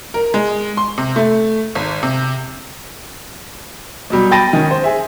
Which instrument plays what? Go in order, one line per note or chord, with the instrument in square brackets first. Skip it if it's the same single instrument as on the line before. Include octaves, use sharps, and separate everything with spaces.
[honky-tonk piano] A#4
G#3
C6
C3
A3
G#1
C3
[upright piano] B2 F#3 G3
G5 A5 B5 A6 A#6 D#7
D#3 C#4
C5
G#4 E5